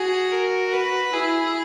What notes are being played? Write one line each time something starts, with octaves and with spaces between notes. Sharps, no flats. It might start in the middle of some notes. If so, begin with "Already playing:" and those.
Already playing: F#4 G#4
A#4
B4
E4 G#4